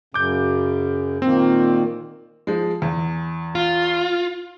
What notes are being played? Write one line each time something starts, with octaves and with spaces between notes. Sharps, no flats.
F#2 C#3 D6 G6
A#2 D#3 A#3 C4
F3 G#3
E2
F4